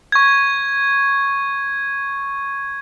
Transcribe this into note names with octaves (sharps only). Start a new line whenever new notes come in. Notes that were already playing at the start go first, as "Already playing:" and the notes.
C#6 G#6